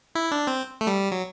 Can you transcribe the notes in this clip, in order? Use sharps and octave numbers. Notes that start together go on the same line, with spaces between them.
E4
D4
C4
A3
G3
F#3